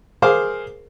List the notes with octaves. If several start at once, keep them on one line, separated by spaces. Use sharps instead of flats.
G#4 A#4 C5 F5 D6